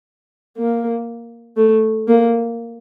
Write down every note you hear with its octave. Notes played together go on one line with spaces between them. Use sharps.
A#3
A3
A#3